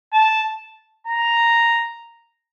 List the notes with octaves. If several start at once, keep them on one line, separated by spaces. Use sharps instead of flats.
A5
A#5